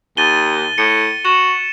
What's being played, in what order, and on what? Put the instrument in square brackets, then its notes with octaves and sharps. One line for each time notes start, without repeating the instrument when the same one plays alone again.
[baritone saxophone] D#2 [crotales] A6 D#7 G7
[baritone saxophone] A2 [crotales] C#7
[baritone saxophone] F#4 [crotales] E7